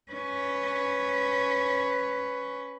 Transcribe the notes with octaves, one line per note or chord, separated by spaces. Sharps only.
C#4 B4